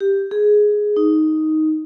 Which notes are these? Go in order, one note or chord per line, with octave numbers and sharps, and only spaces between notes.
G4
G#4
D#4